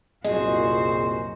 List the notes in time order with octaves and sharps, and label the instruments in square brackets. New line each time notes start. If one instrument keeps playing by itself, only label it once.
[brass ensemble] C2 F#2 A#2 [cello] F#4 C5 [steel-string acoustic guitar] G#4 [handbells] D#5